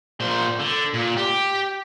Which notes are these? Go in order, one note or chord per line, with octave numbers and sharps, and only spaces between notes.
A#2 C5
D3
A#2
G4